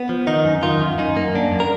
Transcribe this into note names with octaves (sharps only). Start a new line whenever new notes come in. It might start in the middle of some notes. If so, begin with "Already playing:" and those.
Already playing: B3
F3
D#3 D#4
F#2
D#3 F4
F#2
F#2 D#4
A#3
F#2 D4
F#2
A#4